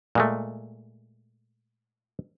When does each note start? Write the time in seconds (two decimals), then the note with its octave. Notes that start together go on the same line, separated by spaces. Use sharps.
0.15 A#2 G#3 A3